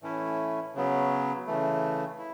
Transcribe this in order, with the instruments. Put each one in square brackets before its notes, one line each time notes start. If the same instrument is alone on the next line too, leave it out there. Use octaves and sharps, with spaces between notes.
[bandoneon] A2 E3 A3 C#4 E4
C#3 F#3 B3
C#3 E3 A3
E4